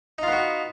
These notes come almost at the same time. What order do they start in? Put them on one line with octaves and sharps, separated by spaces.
D#4 F4 B3 F#4